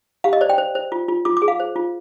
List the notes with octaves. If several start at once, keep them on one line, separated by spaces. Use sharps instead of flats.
G4 F5
D#5
C5 D5
G5
C5
C5
F4
F4
F4 D6
D6
G#4
F5
C5
F4